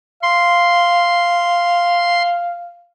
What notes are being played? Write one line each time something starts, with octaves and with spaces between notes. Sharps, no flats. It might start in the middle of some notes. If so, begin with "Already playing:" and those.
F5 C6